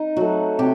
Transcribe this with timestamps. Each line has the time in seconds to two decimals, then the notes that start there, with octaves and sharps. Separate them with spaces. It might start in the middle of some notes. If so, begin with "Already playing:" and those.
Already playing: D#4
0.17 F#3 A3 F#4
0.59 C3 G4